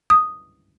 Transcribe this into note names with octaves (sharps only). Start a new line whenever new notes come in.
D#6